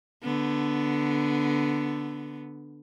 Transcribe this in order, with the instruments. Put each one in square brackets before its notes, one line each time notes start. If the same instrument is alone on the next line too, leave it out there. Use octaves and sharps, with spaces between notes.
[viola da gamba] D3 B3